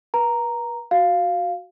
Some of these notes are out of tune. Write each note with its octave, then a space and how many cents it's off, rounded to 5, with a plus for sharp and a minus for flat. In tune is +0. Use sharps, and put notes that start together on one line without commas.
B4 -40 A#5 +0
F#4 +0 F5 +0